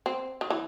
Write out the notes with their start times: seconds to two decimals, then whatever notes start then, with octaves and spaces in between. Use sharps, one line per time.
0.06 C4
0.41 D#3
0.50 E3